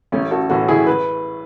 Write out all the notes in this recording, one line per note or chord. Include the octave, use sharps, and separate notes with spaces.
A1 A3 C#4
F#4 A4
A2 E3 F#4 A4
E4 G#4
B4